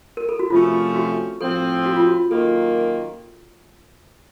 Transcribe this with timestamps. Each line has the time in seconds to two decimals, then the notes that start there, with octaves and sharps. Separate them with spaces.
0.17 A#4
0.29 A4
0.39 F#4
0.50 C3 F3 A3 C#4 F4
0.96 F#4
1.40 A2 F3 C4 A4
1.86 F#4
1.96 F4
2.07 F#4
2.31 F#2 D#3 A#3 F4 A4